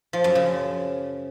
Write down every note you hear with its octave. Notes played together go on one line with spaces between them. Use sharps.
F3
F#2
C#3